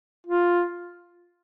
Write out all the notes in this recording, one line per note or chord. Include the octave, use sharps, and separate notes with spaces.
F4